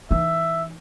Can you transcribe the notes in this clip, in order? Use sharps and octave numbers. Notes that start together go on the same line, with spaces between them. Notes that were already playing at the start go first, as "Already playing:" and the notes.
E3 D#4 E5